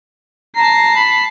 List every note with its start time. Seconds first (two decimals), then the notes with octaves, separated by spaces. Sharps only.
0.56 A5 A#5 C7
0.96 B5